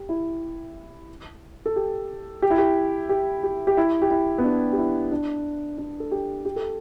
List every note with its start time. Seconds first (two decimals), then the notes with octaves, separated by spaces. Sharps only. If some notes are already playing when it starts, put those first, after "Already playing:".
Already playing: G4
0.09 E4
1.66 A4
1.76 G4
2.42 G4
2.50 E4
2.58 G4
3.09 G4
3.43 G4
3.67 G4
3.77 E4
4.02 G4
4.11 E4
4.38 B3
4.44 D4
4.72 G4
4.78 E4
5.11 D4
5.78 D4
6.00 A4
6.11 G4
6.45 G4
6.56 A4